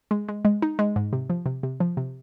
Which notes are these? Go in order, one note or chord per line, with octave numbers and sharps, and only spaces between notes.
G#3
G#3
G#3
D#4
G#3
G#2
C3
F3
C3
C3
F3
C3